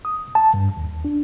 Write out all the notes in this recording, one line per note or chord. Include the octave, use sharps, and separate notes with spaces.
D#6
A5
G2
D#2
D4